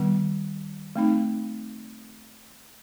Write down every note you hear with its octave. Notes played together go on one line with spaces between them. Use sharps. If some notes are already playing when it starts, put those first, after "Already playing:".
Already playing: D#3 G3 B3
A3 C4 D#4